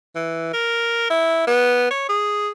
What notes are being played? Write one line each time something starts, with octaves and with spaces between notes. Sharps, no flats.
E3
A#4
E4
B3
C#5
G#4